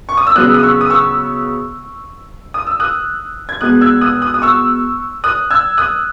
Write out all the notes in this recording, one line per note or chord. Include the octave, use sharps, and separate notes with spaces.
C#6
D#6
E6
C#3 F#3 B3 D#6 F#6
D#6
C#6 E6
D#6
C#6 E6
D#6
E6
D#6 F#6
G#6
B2 G#3 B3 D#6 F#6
E6 G#6
D#6 F#6
D#6 F#6
D#6
C#6 E6
D#6 F#6
E6 G#6
D#6 F#6